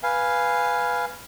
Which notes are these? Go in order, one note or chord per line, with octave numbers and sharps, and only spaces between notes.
B4 F5 G#5